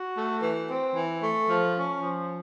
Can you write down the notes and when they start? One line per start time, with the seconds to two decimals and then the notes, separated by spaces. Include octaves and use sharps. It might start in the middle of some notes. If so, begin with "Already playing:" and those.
Already playing: F#4
0.15 A3
0.41 E3
0.69 C4
0.95 E3
1.21 A3
1.48 F3
1.75 C#4
2.00 F3